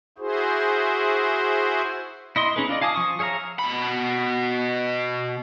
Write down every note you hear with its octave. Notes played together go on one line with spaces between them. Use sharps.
E4 F#4 G#4 C5
E4 D#5 C6
C#4 D#4 G#4 B4
F4 D5 D#5
F5 G#5 A5 D6 D#6
F3 C#6 D#6
G#4 C#5 E5 F5 A#5
B2 B5